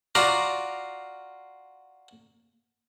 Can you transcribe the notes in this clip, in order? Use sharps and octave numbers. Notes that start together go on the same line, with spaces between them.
F4 F#4 D5 F5 A#5 D6